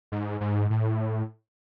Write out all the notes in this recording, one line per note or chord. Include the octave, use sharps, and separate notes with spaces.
G#2
G#2
A2